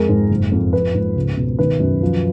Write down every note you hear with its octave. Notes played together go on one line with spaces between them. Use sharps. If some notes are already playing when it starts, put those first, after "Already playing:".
Already playing: F2 G#3 A#4
G#2
F#1
F2
F3 B4
G#2
C#2
B2
D#3 B4
F#2
F3